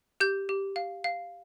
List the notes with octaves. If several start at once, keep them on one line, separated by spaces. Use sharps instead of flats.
G4 G6
G4
F5
F5